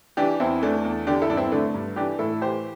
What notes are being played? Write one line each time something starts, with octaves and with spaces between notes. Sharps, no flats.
E3 D4 G4
E2 C4 E4
E3 A3 D4
E2
D3 D4 G4
E4 A4
G2 D4
C4 E4
D3 A3 D4
G2
E3 D4 G4
A2 E4 A4
E3 G4 C5